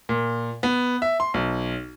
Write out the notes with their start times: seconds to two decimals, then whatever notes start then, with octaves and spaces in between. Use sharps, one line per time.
0.09 A#2
0.63 B3
1.02 E5
1.20 C6
1.34 B1